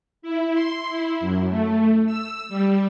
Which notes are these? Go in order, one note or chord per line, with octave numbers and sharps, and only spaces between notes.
E4
C6
E4
F#2
A3
E6
G3